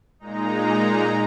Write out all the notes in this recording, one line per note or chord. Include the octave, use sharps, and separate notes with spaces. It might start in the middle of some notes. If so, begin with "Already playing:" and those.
A#2 G#3 D#4 A#5